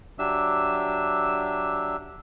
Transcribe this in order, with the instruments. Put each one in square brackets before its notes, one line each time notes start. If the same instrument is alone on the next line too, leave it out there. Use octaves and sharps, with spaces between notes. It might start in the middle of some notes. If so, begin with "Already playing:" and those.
[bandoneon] F#3 D4 G4 E5 E6